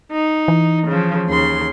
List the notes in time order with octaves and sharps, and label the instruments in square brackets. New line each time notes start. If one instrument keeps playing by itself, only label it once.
[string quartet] D#4
[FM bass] E3
[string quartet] C#3 F3
D#2 C#3 C6